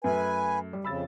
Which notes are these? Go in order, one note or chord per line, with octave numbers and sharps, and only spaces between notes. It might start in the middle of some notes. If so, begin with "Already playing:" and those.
F#2 A3 B4 G#5
G3
F2 C#3 B5 E6 A6